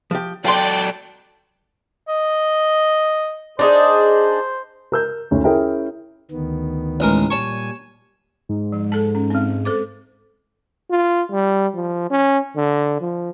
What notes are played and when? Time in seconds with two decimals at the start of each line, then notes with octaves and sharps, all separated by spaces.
0.11 F3 G4
0.45 F#3 A4 D5 F5 G5 C6
2.08 D#5
3.59 D4 D#4 G#4 C5
4.92 A#4 E6 G6
5.31 D2 D#3 C#4
5.44 C#4 E4 G#4 A#4 E5 G5
6.31 D2 D#3 B3
7.00 A1 G#3 A#4
7.30 A#2 G3 C#5 G#5 A5 C#6
8.49 G#2
8.72 F3
8.92 A4 A5
9.15 C#4
9.30 G#3 C4
9.65 A4 C5 D6
10.91 F4
11.31 G3
11.74 F3
12.11 C#4
12.56 D3
13.01 F3